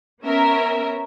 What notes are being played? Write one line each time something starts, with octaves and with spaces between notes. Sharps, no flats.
B3 C#4 A#4 E5